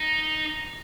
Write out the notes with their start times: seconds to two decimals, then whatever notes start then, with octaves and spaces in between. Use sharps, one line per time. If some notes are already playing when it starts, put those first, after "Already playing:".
Already playing: D#4